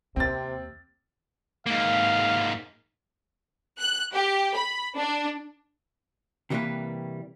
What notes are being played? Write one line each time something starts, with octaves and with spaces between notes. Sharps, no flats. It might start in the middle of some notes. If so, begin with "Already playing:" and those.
D#2 C3 C4 A6
G#2 A#3 F5
F#6
G4
B5
D4
C3 E3 G3 G#3 A#3 B4